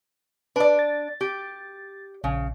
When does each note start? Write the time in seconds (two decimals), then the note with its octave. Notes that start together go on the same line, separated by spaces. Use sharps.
0.56 D4 B4 D5
0.79 A6
1.21 G4
2.24 A#1 C#3